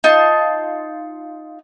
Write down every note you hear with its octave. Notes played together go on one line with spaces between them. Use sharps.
D#4 F4 A5